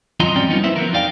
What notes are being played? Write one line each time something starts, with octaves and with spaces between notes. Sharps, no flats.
F2 F#3 F4 D#5 A#5 C6
G#2 F3 C4 C#4 D5 G5
F3 G3 B3 C#4 D#4 F4
A#3 E4 B4 C5 E5
F3 F#3 B3 A#4
F2 D#4 D5 F5 G5